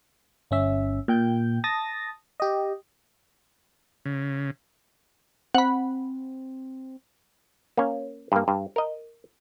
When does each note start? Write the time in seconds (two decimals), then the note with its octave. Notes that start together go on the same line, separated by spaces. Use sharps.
0.51 G1 C#4 E5
1.08 A#2 G5 G6
1.64 A5 D#6 A6 A#6
2.40 G4 D#5
4.05 C#3
5.55 C4 F#5 B5
7.77 A#3 C#4
8.32 G2 A#3
8.48 G2
8.76 A#4 D#5